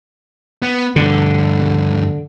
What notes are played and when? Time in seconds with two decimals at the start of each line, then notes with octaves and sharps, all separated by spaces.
0.62 B3
0.96 D2 G2 D3